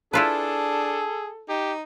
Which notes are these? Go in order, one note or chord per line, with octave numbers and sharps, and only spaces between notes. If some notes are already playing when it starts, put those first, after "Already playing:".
D4 E4 F4 G#4 A4 B4
D#4 G4